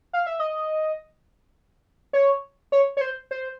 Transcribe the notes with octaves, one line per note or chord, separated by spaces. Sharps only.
F5
E5
D#5
C#5
C#5
C#5
C5
C5